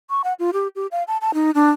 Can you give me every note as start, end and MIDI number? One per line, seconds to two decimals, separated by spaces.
0.10 0.22 85
0.24 0.33 78
0.39 0.51 65
0.53 0.68 67
0.76 0.87 67
0.91 1.03 77
1.08 1.17 81
1.21 1.34 81
1.34 1.51 63
1.55 1.71 62